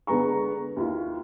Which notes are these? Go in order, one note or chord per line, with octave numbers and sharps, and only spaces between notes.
D3 G#3 B3 A#5 C#6
D#2 E4 F4